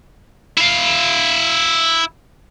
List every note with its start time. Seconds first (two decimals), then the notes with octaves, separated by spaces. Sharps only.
0.57 E4 F5